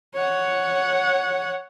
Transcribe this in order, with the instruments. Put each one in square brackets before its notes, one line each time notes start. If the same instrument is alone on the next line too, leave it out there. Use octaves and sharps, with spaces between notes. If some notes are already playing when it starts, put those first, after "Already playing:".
[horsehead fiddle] C#5 F#5